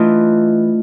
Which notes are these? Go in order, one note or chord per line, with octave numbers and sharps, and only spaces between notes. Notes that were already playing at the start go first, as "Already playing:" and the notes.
Already playing: E3 A3 D4 F4 D#5